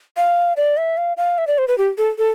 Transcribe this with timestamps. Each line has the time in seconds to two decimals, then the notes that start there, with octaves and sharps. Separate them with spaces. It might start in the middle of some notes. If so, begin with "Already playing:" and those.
0.17 F5
0.57 D5
0.77 E5
0.97 F5
1.17 F5
1.38 E5
1.47 D5
1.58 C5
1.68 B4
1.78 G4
1.98 A4
2.18 A4